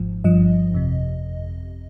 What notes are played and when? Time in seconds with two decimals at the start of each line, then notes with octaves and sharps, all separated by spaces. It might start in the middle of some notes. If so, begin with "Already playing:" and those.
Already playing: G#1 G#2 F3
0.24 G1 G2 F3 D#5
0.72 G1 F2 C3